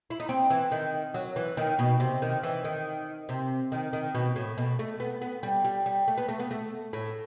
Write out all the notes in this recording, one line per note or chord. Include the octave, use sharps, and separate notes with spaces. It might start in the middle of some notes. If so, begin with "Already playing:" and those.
E4
D#4
C4
E3
D#3
F#3
E3
D#3
B2
C3
D#3
E3
D#3
C3
D#3
D#3
B2
A2
B2
A3
B3
B3
G3
G3
G3
A3
B3
A3
B3
A3
A2